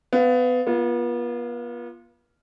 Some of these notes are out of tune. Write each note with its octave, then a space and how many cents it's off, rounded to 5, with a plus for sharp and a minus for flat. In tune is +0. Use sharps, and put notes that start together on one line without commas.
B3 +25 F5 +0
B3 -40 F4 -10